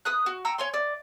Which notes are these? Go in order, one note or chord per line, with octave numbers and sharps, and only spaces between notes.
B4 D#6 F#6
F#4
G5 A#5 C#6 E6
C#5 G#5 C6
D5